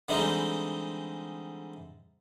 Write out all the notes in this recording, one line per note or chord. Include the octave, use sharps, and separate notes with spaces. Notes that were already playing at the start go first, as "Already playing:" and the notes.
D3 E3 G3 G#3 C4 D#4